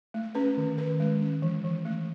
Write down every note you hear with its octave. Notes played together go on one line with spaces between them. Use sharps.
A3
C#4 B4
D#3
D#3 B4
G#3
C#4
E3
E3
A3